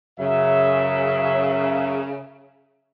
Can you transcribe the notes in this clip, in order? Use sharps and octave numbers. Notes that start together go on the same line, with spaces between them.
F#2 C#3 F#3 E5